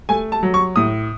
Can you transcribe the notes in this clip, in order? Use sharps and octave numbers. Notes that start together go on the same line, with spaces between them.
A3 G#5
A5
F#3
C#6
A2 D#6